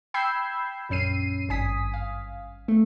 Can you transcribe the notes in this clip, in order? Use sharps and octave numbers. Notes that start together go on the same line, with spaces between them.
G5 B5 E6 G6 G#6 C7
A#1 F#2 C#4 C7 D#7
G#1 G2 G#5 D#6 B6
F5
A3